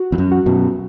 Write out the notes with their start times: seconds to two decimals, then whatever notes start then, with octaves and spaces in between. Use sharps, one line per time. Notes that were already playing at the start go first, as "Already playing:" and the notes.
Already playing: F#4
0.12 E2
0.18 F#2
0.32 F#4
0.46 F#2 B2